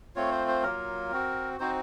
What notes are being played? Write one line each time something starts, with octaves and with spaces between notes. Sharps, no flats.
A3 C4 F4 C#5
C5
C5
F#3 A#3 F4 A#4
C4 F#4
C4 D#4 F#4 C5